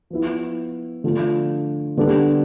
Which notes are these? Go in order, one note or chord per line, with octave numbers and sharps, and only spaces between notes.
F3 B3 E4
D3 F3 A3 D4 F4
D3 G3 B3 D4 A4